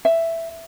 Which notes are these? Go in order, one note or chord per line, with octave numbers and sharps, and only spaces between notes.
E5